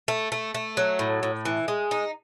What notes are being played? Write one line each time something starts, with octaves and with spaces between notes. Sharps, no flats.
A3
A3
A3
F#3
A2
A2
E3
G#3
D#4